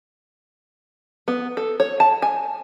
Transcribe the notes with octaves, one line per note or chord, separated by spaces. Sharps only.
B3
A4
C#5
A5
G#5